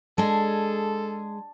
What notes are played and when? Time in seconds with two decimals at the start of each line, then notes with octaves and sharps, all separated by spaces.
0.18 G#3 D4 G#4 A4 A5